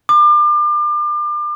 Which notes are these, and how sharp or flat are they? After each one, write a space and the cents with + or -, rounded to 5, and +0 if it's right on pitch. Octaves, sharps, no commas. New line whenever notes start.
D6 +35